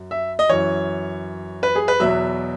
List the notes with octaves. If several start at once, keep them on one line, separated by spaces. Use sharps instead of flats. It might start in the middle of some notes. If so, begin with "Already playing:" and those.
Already playing: F#2
E5
D#5
F#2 E3 C#5
B4
G#4
B4
E2 B2 F#3 E5